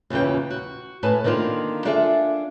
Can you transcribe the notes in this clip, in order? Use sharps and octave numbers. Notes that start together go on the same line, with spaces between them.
D#2 A#2 C#3 E3 G5
F#4
A2 B4 G#5 A5
D3 D#3 A#3 C4 F4
D4 F4 G#4 A4 E5